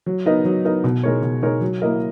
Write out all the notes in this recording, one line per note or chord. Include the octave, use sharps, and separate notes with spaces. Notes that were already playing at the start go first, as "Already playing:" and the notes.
F#3
B3 D#4 A#4 D#5
F#3
B3 D#4 A#4 D#5
B2
G#3 D#4 A#4 C#5
B2
G#3 D#4 A#4 C#5
F#3
A#3 E4 A#4 D#5